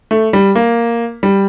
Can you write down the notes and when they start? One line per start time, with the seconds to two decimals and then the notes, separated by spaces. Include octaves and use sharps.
0.11 A3
0.33 G3
0.55 A#3
1.23 G3